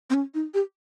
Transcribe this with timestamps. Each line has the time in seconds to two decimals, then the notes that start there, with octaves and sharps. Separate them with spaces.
0.10 C4
0.14 C#4
0.34 D#4
0.54 G4